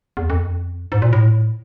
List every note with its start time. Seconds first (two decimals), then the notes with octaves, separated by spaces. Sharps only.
0.17 E2
0.30 F2
0.92 G#2
1.02 A#2
1.13 A2